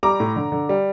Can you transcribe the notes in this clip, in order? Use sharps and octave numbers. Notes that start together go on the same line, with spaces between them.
G3 A#5 D6
A2
D3
D3
G3